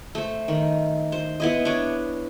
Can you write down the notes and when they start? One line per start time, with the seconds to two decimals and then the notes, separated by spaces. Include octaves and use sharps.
0.15 A3 C5
0.48 D#3
1.12 C5
1.40 B3 E4 D#5
1.65 D4 C#5